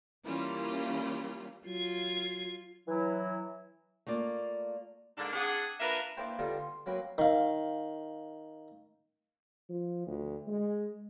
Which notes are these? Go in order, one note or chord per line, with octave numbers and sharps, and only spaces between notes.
E3 G3 A#3 C#4 E4 F4
F#3 F4 G#6 C7
E3 F#3 E4
A3 A#3 F4 D5
G#2 D3 A#3 D4
C4 D4 G#4 D5 F#5
A#3 D4 F4 A#4 B4 E5
A#3 D4 E4 B4 C5 G5
D3 G3 B3 D4 D#4 F4
C6
F#3 A#3 C4 B4
D#3 F5
F3
D2
G#3